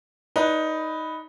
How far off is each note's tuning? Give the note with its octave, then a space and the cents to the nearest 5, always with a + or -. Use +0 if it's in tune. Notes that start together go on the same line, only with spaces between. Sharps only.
D#4 +10 B4 +0 D5 +0